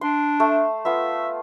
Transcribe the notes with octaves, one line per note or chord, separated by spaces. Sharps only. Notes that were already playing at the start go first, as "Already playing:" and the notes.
D4 C6
A3
B3 F4 E5